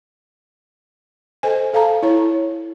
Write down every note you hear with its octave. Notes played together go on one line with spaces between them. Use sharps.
A4 C5 D#5 G#5
A4 F5 A5 A#5
E4 C#5